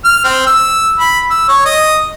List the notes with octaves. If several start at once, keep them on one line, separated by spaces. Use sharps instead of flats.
F6
C4
E6
B5
E6
C#5
D#5